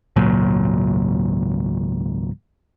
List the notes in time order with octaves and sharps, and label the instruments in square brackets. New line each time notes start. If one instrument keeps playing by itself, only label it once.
[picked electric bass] G#1 C#2 A#2 F#3